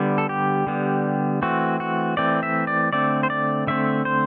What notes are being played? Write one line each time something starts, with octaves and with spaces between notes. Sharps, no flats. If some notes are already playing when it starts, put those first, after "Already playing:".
Already playing: D3 G3 B3
A4
G4
D3 G3 B3
E3 A3 C4 F#4
F#4
E3 A3 C4 D5
E5
D5
D3 A3 C4 D5
C5
D5
D3 A3 C4 E5
C5